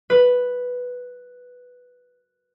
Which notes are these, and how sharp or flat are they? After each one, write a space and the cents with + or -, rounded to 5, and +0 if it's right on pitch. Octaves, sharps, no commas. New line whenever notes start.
B4 +0